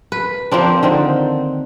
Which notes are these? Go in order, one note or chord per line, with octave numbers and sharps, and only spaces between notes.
B4
F3 A#3 C4 D4
D3 D#3 C4